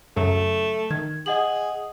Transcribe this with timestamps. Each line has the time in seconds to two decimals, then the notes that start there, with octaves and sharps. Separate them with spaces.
0.17 F#2 C#3 F#3 A3
0.91 D#3 G#6
1.26 G#4 D#5 F#5 F#7